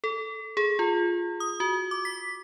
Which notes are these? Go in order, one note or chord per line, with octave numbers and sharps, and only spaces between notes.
A4
G#4
F4
D#6
F#4
D6
B6